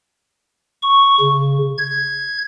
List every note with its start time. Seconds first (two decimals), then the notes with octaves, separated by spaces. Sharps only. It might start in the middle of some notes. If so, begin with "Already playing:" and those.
0.82 C#6
1.20 C#3
1.78 G#6